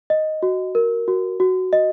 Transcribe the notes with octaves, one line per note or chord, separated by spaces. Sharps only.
D#5
F#4
A#4
F#4
F#4
D#5